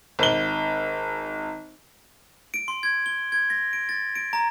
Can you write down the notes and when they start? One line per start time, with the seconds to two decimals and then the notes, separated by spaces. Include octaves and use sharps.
0.19 G#1 G7
2.54 D7
2.68 C6
2.83 G#6
3.06 G7
3.32 G#6
3.50 A#6
3.73 D7
3.89 A6
4.16 D7
4.33 A#5